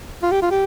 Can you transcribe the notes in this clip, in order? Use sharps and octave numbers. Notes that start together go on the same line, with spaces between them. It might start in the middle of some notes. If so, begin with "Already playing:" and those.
F4
G4
F4
G4